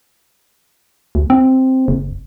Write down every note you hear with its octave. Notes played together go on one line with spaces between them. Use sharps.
D2
C4
F#1